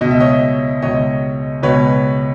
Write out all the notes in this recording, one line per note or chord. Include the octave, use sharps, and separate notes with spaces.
C#2 B2 D#5
E5
C#5 D#5
C#2 B2 C#5 D#5
C#2 B2 B4 C#5